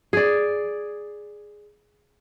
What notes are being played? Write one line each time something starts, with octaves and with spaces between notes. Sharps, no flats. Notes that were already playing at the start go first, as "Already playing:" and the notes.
G#4 D5